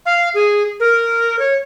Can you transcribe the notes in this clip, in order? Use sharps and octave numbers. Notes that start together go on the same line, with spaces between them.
F5
G#4
A#4
C#5